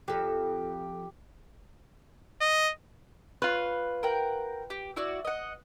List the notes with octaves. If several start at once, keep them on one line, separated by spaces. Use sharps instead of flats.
F2 G4 A4
D#5
F4 B4 C#5
A#4 F#5 G5
G4
E4 F#4 D5
D#5 F#5